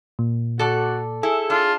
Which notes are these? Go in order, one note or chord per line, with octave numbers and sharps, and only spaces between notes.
A#2
F#4 A4 D5
E4 G#4 A4
D4 F4